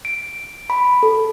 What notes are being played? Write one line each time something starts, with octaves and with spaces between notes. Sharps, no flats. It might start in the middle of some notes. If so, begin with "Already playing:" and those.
D7
B5
A4